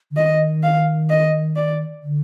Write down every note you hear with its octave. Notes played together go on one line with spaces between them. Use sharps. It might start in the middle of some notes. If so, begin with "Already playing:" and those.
D3
D#3 D#5
F5
D#5
D5
D3